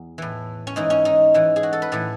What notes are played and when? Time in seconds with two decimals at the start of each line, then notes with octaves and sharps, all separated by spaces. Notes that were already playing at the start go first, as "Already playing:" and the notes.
Already playing: E2
0.18 A2 E3
0.67 C#4
0.76 G#2 E3 D#4
0.90 C#4
1.05 D#4
1.34 G#2 E3
1.56 G#4
1.63 F#4
1.73 A4
1.82 B4
1.92 A2 E3 A4